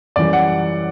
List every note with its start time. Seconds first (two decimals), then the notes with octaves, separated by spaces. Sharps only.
0.16 F#2 E3 G3 D5
0.33 F#5